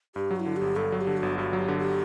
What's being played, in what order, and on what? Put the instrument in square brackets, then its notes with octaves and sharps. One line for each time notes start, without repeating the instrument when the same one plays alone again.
[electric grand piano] G2 [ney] G4
[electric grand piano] F#3
[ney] F#4
E4
[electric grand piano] D3
[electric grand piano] G1 [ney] G4
[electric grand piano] G2 [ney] A4
[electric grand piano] F#3
[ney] A4
G4
[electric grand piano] D3
[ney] F#4
[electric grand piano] G1
[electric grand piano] G2 [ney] F#4
[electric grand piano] F#3
[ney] G4
[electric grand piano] D3
[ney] G4